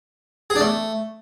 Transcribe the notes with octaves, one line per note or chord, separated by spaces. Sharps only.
G#4
D4
A3